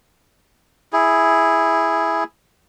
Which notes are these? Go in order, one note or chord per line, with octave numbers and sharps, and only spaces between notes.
E4 G#4